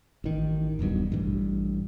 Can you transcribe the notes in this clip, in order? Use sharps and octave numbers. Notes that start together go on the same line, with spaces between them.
A1 D#3
D#1 B1 G2 B2
A1 G2